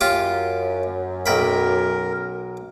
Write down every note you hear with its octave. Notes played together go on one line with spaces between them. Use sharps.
F#2 F4 G4
B1 A#4 G5 B5